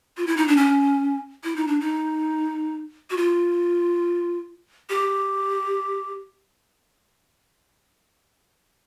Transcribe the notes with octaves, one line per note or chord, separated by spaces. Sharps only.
F4
E4
D#4
D4
C#4
E4
D#4
D4
D#4
F#4
F4
G4